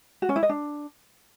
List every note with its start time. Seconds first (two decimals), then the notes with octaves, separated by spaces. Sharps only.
0.22 F#4
0.29 C#4
0.36 E4
0.43 D#5
0.49 D4